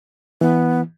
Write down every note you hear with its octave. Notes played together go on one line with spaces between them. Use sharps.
E3 B3